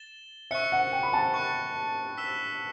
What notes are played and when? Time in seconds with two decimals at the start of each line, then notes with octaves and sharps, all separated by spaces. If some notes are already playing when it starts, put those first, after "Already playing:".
Already playing: A6 E7 G7
0.51 E5 C#6 F#6 C#7
0.72 F#5
0.93 G5
1.03 B5
1.13 A5
1.34 C#6 F#6 C#7
2.17 E6 B6 E7 G7